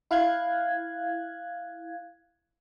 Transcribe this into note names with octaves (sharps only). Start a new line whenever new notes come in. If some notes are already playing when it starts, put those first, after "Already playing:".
E4 F5 F#6 G#6